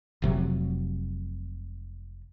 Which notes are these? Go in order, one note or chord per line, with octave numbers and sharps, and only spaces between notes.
F1 C3 F#3